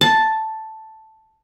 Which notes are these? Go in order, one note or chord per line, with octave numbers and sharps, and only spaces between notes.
A5